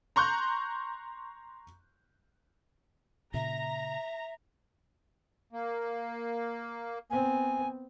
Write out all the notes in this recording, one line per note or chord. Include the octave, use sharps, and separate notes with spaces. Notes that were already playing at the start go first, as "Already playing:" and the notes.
A#5 C6 C#6 F#6 G6
A#2 C#3 E5 A#5
A#3
B3 C4 G#5